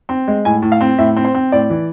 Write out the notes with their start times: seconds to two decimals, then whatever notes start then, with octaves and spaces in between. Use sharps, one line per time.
0.09 C4
0.28 G#3
0.45 A2 G#5
0.62 A2
0.72 F5
0.81 C4
0.98 A2 E5
1.16 C4
1.24 C5
1.34 C4
1.52 A2 D5
1.70 E3